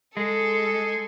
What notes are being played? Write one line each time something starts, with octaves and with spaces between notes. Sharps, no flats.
G#3 G#4 A4